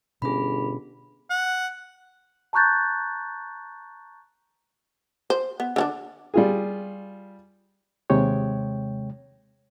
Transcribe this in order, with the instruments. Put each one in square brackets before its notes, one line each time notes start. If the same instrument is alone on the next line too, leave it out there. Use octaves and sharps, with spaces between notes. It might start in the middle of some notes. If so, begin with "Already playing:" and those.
[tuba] G1 [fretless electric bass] B2 C#4 [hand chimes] G#4 B5
[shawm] F#5
[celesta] A5 A#5 C#6 F#6 G6 A6
[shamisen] C5
B3
D3 C#4 D4
[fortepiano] G3 F4 G#4
[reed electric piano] D#2 C3 G#3 C#5 G5